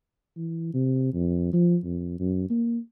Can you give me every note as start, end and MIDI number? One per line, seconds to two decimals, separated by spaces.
0.36 0.73 52
0.74 1.13 48
1.13 1.52 41
1.53 1.77 53
1.84 2.17 41
2.19 2.49 42
2.50 2.78 58